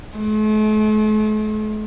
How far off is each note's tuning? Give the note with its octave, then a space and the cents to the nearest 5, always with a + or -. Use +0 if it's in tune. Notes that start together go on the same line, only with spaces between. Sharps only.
A3 -45